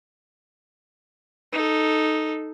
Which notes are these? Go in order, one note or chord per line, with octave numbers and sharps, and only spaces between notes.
D#4 A4